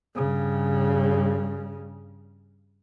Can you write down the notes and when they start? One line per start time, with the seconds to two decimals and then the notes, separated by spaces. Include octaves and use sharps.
0.16 G2 C#3